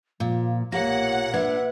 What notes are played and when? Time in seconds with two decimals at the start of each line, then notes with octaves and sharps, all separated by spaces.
0.20 A#2 F3
0.72 B1 A#2 A#3 G4 C#5 F#5 A#6
1.34 D4 B4 E5 G#6